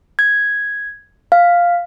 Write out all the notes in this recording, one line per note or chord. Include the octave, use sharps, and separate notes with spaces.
G#6
F5